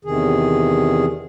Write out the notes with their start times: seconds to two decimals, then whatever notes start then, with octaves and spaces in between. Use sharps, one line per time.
0.05 E2 C3 D#3 G#4